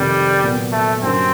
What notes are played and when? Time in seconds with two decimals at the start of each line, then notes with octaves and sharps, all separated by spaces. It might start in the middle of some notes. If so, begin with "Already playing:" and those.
Already playing: F2 C3 D#3 G3
0.42 A#2 F#3 B3
0.72 A3
1.02 G2 D3 F#3 A#3 C4 C#4